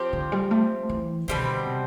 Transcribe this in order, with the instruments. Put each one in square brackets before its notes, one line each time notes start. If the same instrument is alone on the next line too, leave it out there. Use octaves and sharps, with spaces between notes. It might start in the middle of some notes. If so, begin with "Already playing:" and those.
Already playing: [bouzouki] F3 C4 G4
[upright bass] D3
G3
A3
E3
[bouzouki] B2 G3 C4 [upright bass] D3
[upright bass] C3